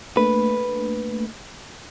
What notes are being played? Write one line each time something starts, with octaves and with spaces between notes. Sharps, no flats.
A3 A#3 D4 B4